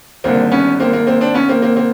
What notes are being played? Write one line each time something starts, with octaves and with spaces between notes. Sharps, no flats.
G#1 G2 D3 A#3 C4
B3 C#4
A#3 C4
A#3
A#3 C4
C4 D4
B3 C#4
A#3 C4
A#3 C4
A#3 C4